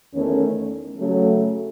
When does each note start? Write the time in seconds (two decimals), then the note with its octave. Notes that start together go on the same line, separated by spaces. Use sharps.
0.12 E2 D#3 A3 C#4
0.97 C#3 F#3 A3